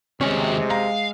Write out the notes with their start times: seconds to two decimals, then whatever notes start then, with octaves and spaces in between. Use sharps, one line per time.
0.21 D#2 C3 G#3 C#4 F#4
0.70 F5 A#5